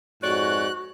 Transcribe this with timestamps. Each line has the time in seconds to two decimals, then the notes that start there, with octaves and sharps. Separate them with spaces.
0.23 F2 G#2 F#4 C#5 D5 F#6